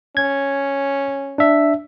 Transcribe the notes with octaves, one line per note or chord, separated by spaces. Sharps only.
C#4 G#6
D4 E5